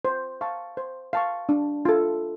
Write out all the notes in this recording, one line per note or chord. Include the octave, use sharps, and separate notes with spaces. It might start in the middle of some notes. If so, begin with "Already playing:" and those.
C5
F5 A5 C#6
C5
F5 A5 C#6
D4
F4 A4